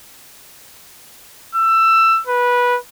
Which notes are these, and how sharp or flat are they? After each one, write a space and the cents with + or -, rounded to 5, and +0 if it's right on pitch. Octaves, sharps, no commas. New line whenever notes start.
E6 +15
B4 -15